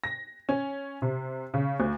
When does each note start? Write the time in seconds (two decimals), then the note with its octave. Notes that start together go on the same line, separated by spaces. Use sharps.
0.04 A#6
0.49 C#4
1.02 C3
1.54 C#3
1.80 D2